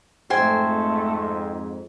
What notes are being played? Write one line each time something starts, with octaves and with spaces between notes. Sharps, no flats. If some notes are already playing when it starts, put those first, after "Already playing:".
F2 G#2 A3 C5 G5 G#5